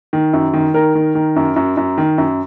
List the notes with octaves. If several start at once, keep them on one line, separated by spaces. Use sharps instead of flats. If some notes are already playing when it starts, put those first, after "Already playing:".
D#3
F#2
D#3
D#3 A#4
D#3
D#3
F#2
F#2
F#2
D#3
F#2